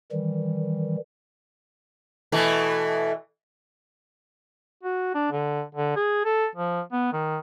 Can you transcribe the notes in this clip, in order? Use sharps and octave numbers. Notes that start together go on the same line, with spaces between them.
D#3 E3 G3
B2 E3 A3
F#4
D4
D3
D3
G#4
A4
F3
B3
D#3